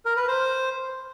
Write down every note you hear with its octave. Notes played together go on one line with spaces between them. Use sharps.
A#4
B4
C5